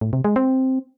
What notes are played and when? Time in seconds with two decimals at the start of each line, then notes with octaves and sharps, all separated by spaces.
0.01 A2
0.13 C3
0.24 G#3
0.36 C4